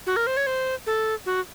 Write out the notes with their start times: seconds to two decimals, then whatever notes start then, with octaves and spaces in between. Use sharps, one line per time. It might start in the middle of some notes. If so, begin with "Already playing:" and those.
0.07 F#4
0.16 A#4
0.27 C5
0.37 C#5
0.47 C5
0.86 A4
1.26 F#4